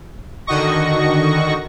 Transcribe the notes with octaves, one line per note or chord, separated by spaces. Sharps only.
D3 D#3 F#4 D#5 C#6 A#6